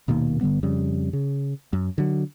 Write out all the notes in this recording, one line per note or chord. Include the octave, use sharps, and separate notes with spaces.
D#1 B2 D#3 A#3
G1 D3 G3 B3
F2 C#3 G3
C#3
F#2
D3 F#3